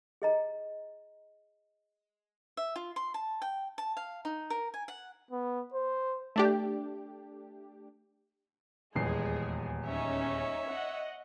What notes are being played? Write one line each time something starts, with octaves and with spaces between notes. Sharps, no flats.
G#4 D#5 A#5
E5
F4
C6
A5
G5
A5
F5
D#4
A#4
G#5
F#5
B3
C5
A3 D4 G4
D#1 E2 G#3 G#4 C7
C#4 D#4 C#5 E5
D#5 F#5